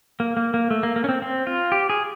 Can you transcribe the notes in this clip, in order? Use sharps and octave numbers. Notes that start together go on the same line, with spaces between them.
A#3
A#3
A#3
A3
A#3
A#3
C#4
C4
C4
F4
G4
G#4